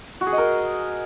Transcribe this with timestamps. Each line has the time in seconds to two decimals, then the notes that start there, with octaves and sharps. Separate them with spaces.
0.21 F#4
0.27 G#4
0.32 D#5
0.38 A#4